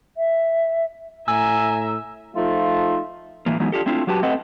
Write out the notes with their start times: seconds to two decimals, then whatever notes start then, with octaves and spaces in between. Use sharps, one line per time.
0.17 E5
1.28 A2 E5 G#5 A#5 E6
2.35 F3 A3 D#4 F4
3.46 A2 E3 A#3
3.60 E3 F#3 G#3 B3 D#4
3.72 D4 F4 G4 A4
3.86 A3 C4 D4 E4 F4
4.07 F#3 F#4 G4 B4 A5
4.23 A3 C4 A4 B4 D#5 F#5